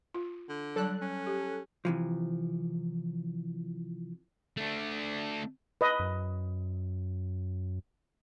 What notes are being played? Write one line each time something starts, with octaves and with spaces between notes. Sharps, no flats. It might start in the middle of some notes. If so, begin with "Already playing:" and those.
F4
D3
F#3 G3 A4 F#6
C#4
G4
C3 E3 F3
A3 D4
B4 D#5
F#2